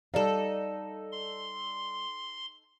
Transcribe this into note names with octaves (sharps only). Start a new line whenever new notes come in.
G3 D#4 A4 D5 F5
C6